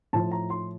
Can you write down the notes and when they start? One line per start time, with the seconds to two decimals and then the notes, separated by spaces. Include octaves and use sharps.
0.13 A2 F3 A5
0.32 A#5
0.50 C6